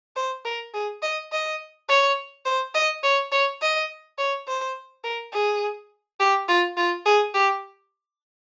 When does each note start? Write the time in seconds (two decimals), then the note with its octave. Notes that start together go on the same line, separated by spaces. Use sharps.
0.16 C5
0.45 A#4
0.74 G#4
1.02 D#5
1.32 D#5
1.89 C#5
2.46 C5
2.75 D#5
3.03 C#5
3.32 C#5
3.62 D#5
4.18 C#5
4.48 C5
5.04 A#4
5.33 G#4
6.20 G4
6.48 F4
6.77 F4
7.06 G#4
7.34 G4